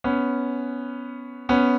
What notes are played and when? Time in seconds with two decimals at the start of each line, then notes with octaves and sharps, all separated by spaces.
0.04 B3 C#4
1.49 B3 C#4